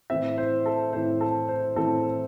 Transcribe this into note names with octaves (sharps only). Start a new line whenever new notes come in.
A2 E3 C4 E5
C5
A4
A2 E3 C4 C5
A4
C5
A2 E3 C4 A4